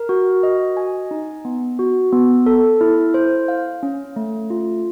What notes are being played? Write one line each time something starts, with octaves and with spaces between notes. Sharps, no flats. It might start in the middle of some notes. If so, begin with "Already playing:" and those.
Already playing: A#4
F#4
D#5
G#5
D#4
B3
F#4
B3
A4
E4
C5
F5
C#4
A3
F4